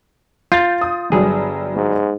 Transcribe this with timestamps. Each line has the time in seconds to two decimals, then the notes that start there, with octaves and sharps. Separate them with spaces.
0.52 F4 G6 A6
0.81 D#6
1.12 G1 F#3 G3 G#4
1.75 G#2